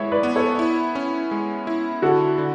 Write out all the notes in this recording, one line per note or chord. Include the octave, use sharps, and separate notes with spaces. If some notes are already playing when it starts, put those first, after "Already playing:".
Already playing: G#3 B3 E4 C#5 E5
B4 D5
B3
A4 C#5
E4
C#4
G#3
E4
D3 F#4 A4
D3